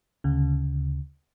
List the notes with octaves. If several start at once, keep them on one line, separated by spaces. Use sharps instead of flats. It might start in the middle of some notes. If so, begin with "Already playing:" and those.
D2 C#3